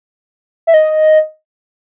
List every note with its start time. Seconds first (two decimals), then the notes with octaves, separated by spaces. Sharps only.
0.67 E5
0.74 D#5